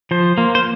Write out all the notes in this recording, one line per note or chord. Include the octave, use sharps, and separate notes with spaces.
F3 C5
A#3
C5